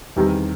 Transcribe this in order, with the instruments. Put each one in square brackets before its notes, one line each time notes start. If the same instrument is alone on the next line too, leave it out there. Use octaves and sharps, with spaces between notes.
[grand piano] E2 C3 D#3 G3